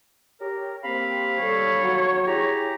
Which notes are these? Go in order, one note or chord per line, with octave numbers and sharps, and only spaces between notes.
G4 A#4 C#5
A#3 C4 G4 F5 B5
G3 A4 C#5
F#3
E4 G4 G#4 A#5